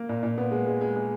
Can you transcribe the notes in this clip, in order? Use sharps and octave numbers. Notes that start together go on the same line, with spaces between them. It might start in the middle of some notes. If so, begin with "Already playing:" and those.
Already playing: A#3
A#2
A#2
B3
G#3
G#3
G#3
G#3